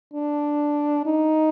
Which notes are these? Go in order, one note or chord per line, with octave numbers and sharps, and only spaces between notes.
D4
D#4